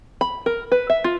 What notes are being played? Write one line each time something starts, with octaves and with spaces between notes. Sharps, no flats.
B5
A#4
B4
E5
F4